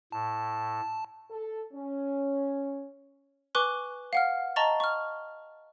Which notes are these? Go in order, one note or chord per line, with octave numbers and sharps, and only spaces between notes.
A2 A5
A4
C#4
B4 G#5 C#6 D6 F#6 G7
F5 F#5 F6
D#5 A5 A#5 C#6 A6 G7
C#6 F6